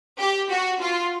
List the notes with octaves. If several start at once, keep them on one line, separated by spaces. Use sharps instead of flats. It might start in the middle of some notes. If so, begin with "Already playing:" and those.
G4
F#4
F4